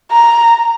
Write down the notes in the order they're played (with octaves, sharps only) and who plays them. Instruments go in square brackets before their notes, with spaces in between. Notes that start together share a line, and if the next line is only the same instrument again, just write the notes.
[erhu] A#5